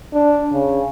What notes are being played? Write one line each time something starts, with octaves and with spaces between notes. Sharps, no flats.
D4
C#3